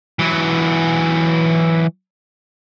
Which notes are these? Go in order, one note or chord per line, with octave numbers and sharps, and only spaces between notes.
E3 F#3